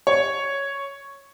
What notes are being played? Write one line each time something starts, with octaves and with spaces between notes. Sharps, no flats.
C#5